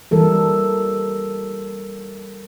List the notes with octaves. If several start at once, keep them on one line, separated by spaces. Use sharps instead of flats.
E3 G3 A4 A#4